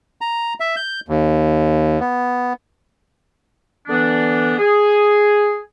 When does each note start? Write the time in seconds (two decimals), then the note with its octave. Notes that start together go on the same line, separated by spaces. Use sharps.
0.21 A#5
0.60 E5
0.76 G6
1.08 D#2
2.00 B3
3.88 D3 E3 B3 D4
4.58 G#4